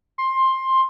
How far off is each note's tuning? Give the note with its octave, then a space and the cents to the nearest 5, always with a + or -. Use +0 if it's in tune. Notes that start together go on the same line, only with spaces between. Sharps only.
C6 +15